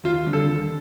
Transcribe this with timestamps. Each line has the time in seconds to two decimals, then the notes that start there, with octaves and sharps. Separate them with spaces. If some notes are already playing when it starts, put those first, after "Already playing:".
0.04 D#2 F4
0.26 D3 G3 C4
0.33 A4
0.46 D#2